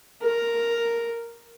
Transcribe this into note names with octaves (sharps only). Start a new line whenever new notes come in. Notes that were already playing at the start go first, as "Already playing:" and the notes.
A#4